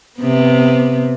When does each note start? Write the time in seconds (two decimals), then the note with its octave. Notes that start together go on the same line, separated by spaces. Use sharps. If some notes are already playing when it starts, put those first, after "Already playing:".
0.19 C3 B3